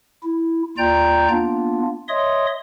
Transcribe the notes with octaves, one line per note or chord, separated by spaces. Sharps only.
E4
D#2 F4 D5 G5 A#5 G6
A#3 B3 D4 F4
C#5 D#5 E5 C6 D#6